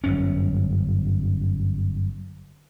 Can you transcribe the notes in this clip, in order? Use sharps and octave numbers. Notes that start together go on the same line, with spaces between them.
G1 F#2 C#4